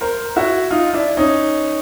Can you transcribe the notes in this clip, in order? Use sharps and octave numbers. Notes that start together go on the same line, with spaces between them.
A#4 C5
E4 F#4
D#4 F4
D4 E4
C#4 D#4